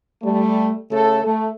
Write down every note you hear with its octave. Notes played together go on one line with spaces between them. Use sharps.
G3 A3
C#3 A3 A4
A3